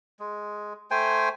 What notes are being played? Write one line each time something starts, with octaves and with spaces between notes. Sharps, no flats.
G#3
A3 C5 G5 G#5